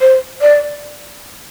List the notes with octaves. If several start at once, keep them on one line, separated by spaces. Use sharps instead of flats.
C5
D5